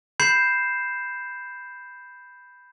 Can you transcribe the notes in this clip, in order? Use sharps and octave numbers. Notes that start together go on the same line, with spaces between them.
B5 G6 C7 E7